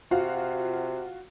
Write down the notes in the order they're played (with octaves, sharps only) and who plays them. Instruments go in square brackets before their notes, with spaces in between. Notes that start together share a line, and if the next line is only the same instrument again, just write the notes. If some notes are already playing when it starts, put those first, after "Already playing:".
[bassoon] C3 [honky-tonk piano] F4 F#4 F5